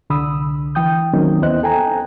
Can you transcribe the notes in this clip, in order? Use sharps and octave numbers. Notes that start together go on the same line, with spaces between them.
C2 D3 B5 D#6 E6
E3 G5 D#6 G6
D#3 F#3 A#3 C4 C#4 D#4
D#2 B3 E4 C5 D#5 F#6
A4 G5 G#5 A#5